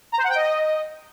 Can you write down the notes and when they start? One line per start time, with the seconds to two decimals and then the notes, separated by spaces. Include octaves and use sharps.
0.12 A#5
0.18 C5
0.24 F#5
0.29 G5
0.35 D#5